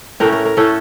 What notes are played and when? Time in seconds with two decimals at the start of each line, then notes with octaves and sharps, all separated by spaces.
0.20 A2 A3 C#4 A#4
0.32 A#4
0.45 A#4
0.57 A2 A3 C#4 A4